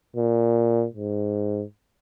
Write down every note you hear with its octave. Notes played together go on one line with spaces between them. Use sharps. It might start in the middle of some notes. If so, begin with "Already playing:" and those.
A#2
G#2